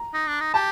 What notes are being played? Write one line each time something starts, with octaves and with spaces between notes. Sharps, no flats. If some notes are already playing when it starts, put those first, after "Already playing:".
Already playing: A#5
D#4
D4
D#4
G4 A5